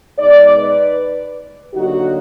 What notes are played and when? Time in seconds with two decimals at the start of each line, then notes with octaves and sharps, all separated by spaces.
0.18 B2 G#3 D#4 D5
0.58 B4
1.73 D3 F#3 A#3 D#4 F#4